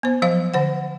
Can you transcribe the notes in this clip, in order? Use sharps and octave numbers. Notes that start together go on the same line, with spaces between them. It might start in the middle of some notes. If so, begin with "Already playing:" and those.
B3 C5
F3 F#3 C5 F5
D3 C5 F#5